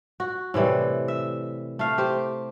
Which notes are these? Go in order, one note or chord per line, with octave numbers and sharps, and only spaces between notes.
F#4
A2 C3 E3 G3
E5
A3 F5
G4 C5